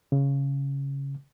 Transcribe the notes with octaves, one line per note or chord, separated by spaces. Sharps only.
C#3